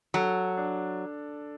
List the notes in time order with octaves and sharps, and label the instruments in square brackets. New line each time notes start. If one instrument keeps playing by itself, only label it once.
[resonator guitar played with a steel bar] F#3 [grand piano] A4
[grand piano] D4